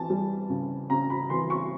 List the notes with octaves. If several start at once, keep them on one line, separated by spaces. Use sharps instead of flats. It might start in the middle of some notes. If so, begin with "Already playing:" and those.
Already playing: E3 A5
G3
C#3
C#3 A#5
B5
E3 C6
C#6